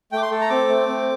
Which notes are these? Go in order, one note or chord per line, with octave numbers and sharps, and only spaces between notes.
A3 G5 D6
C6
A4
A#5
C4 D6
A3
C4